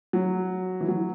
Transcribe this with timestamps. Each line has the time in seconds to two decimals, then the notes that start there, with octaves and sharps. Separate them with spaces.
0.13 F#3
0.81 E3
0.88 F#3